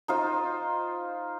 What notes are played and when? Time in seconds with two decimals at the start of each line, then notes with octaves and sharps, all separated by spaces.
0.08 D#4 F4 C5